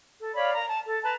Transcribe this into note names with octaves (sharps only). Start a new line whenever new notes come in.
A4
C#5 D5 F5 B5
A#4 A#5
A5
A4
B4 A5 A#5